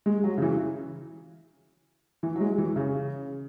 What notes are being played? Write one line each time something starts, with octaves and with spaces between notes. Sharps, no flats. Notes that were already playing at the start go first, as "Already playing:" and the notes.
G#3
F#3
C#3
E3
E3
F#3
G#3
E3
C#3